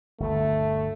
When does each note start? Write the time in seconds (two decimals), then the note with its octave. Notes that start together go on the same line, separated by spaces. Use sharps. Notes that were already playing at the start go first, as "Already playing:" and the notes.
0.20 G1 D2 A3